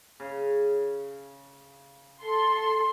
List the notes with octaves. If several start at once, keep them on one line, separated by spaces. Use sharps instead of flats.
C#3
A4 C6